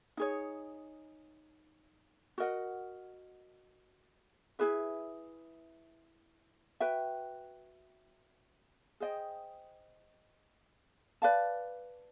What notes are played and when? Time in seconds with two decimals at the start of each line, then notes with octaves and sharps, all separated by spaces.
0.17 D#4 G#4 C#5
2.38 F#4 A#4 D#5 F#5
4.59 E4 G#4 B4 E5
6.80 F#4 B4 E5 G5
9.00 G#4 C5 D#5 G5
11.22 B4 D5 F5 A5